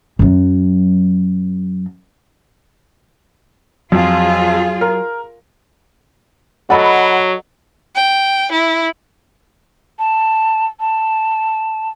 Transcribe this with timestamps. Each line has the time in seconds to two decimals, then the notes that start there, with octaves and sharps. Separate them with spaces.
0.19 F#2 F#3
3.92 F2 F#3 F4 G#4
4.81 A#4
6.70 F#3 A4 D#5 F#5 B5
7.96 G5
8.52 E4
9.99 A5
10.80 A5